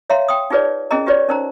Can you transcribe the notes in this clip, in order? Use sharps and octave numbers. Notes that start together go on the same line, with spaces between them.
C#5 E5 F5 A#5 C6
G5 C6 D#6
D#4 F4 G#4 B4 C#5 D5
C#4 E4 G#4 A#4 D#5 A#5
F4 G4 B4 C#5 D5
C#4 D#4 A#4 C5 A#5